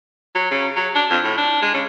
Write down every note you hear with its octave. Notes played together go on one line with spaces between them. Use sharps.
F#3
C#3
F#3
D4
F2
A2
D4
G#3
C#3